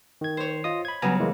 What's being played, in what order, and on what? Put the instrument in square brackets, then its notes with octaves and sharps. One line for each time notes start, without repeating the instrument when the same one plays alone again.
[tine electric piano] D#3 G#6
[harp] C5 C#5
[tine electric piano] F4 D#5 D#6
B5 G#6
[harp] C#3 F#3 G3 [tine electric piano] B3 G#5 A#5
[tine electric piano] E3 G#3 A#3